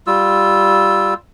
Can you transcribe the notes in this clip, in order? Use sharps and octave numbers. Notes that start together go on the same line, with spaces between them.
G3 F4 E6